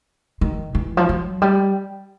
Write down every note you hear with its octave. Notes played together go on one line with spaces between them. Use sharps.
D#3
E3
F3
F#3
G3